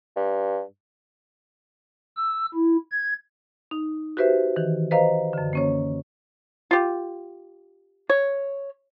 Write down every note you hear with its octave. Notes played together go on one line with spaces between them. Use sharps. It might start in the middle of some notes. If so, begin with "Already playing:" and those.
G2
E6
E4
G#6
D#4
F#4 G4 B4 C5 E5
D#3 E3
B4 C5 D#5 F5 A#5
F#2 D3
A#3 C#4 C#5
F4 G4
C#5